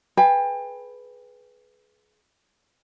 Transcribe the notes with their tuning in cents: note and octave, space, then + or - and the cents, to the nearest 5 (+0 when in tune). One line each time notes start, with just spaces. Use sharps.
G#4 +30 B4 +0 G5 +30